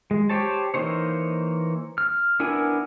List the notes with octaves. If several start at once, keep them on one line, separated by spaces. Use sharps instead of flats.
G#3
G4 C5 C#5 A5
E3 A#3 D#4 C5 C#5
F6
B3 D4 E4 A#4 G#5